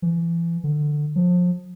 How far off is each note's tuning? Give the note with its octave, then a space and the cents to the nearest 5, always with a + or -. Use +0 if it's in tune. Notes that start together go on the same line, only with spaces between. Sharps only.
E3 +35
D3 +15
F3 +30